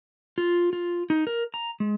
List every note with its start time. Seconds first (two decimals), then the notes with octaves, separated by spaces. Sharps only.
0.38 F4
0.73 F4
1.10 D#4
1.27 A#4
1.54 A#5
1.80 G#3